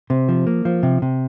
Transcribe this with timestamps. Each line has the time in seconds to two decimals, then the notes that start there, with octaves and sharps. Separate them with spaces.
0.10 C3
0.29 F3
0.47 A#3
0.65 F3
0.83 C3
1.02 C3